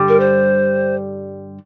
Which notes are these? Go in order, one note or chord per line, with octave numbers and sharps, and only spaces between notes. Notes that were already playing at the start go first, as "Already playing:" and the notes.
Already playing: G2 D3 G3
A#4
C5